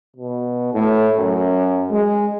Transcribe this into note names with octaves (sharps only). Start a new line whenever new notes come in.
B2
A2
F#2
G#3